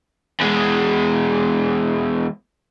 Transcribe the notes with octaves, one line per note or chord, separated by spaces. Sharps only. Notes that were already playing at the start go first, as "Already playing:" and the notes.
E2 G#3